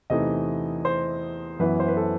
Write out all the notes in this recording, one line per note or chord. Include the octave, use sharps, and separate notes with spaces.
E2 C3 E3 A3 D#4 D#5
C5
F#2 E3 B3 E4 B4
C5
B4
A4